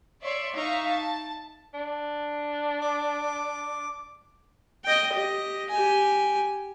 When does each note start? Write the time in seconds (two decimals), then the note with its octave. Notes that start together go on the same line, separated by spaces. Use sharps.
0.23 C#5 D5 E5 C6
0.55 D#4 E5 F5 A#5 C#6
0.87 A5
1.74 D4
2.82 D6
4.84 D#5 G5
5.14 G4 D#5
5.70 G4 G#5